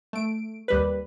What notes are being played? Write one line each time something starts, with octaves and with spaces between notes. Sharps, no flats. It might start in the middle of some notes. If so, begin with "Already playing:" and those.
A3 D7
D#2 G3 B4